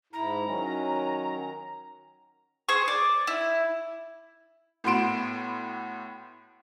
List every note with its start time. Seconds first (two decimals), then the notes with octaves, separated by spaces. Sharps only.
0.13 G#2 E4 A#5
0.45 D#3 F#3 C#4
2.69 G#4 C5 C#6
2.88 D5
3.27 E4
4.84 A2 B3 F#4 C6 D7 E7